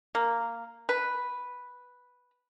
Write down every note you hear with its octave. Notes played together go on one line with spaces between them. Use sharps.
A#3
B4